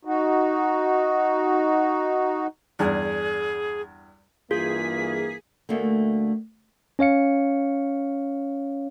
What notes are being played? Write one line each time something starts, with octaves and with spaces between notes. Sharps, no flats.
D#4 F#4
E2 G2 G#4
G2 E3 A#3 F4 G#4 B6
D2 A3 A#3
C#4 C#5 F5 C#7